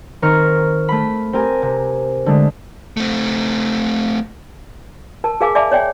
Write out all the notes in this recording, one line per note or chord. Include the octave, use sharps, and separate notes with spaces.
D#3 C4 A#4 C#6 F6
A3 B5
C4 G4 A#4 G#5
C3
D3 G#3 A3
A3 C4
A#4 A5
G#4 A#4 F5 G#5 D6
D5 E5 G#5 A5 B5 D6
C#5 D5 G5 G#5